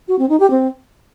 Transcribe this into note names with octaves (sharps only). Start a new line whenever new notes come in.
F#4
C4
D#4
G4
C4